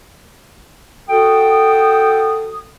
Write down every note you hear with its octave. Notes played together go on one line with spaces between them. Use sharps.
F#4 A4 G5 D#6